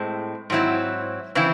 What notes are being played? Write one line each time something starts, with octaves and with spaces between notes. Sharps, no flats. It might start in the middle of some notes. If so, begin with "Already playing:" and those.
Already playing: A2 G#3 C4
G#2 F#3 C4 E4
C#3 E3 C4 E4